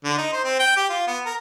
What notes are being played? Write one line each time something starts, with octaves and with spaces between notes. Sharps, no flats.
D3
D#4
C5
C4
G5
G4
F4
B3
A#4